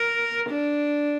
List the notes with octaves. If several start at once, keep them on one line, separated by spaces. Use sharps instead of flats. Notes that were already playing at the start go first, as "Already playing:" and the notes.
Already playing: A#4
D4